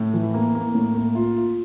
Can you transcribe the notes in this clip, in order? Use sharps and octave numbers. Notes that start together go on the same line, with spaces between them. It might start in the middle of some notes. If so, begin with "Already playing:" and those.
Already playing: A2
E3
A#3
A#3
A2
A#3
F4
F4